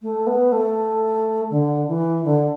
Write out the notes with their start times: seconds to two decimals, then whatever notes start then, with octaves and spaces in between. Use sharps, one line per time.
0.02 A3
0.27 B3
0.52 A3
1.50 D3
1.88 E3
2.25 D3